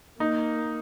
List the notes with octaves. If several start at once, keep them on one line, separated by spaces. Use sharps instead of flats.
A#3 D#4